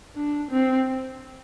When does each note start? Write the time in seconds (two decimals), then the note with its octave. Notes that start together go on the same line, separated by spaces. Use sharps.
0.16 D4
0.51 C4